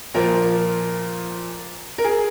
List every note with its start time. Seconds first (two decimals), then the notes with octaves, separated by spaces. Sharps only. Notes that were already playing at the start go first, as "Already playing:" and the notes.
0.14 A#2 F3 A#4
1.98 A#4
2.04 G#4